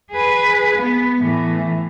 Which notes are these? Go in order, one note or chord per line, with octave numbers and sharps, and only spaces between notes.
G#4 B4
B3
A2 E3